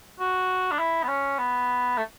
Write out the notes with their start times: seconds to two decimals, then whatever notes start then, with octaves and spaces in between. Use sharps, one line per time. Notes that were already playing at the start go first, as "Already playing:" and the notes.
0.20 F#4
0.71 D4
0.79 E4
1.03 B3
1.08 C#4
1.39 B3
1.97 A3